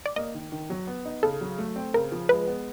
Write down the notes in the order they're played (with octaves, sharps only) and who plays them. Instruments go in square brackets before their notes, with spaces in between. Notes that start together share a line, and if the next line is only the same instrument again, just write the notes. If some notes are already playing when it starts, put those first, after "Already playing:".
[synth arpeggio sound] D5
[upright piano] A#3 [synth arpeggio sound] D#5
[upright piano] D#3
D#3
F#3
B3
D#4
[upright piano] C#3 [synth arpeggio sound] A4
[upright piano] F#3
A3
C4
[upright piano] C#3 [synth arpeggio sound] A#4
[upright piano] F3
[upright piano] G#3 [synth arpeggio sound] B4
[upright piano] B3